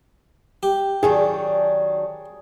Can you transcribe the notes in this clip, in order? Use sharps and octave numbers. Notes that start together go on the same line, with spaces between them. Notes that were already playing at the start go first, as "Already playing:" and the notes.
G4
D#3 F#3 D4 G#4